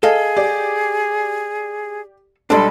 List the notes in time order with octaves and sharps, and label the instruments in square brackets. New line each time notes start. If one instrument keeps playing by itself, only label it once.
[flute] G#4 [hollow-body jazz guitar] A4 D#5 F5
[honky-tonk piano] G4 D5
[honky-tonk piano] B1 G3 B5 [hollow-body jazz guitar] G#3 D4 [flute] A4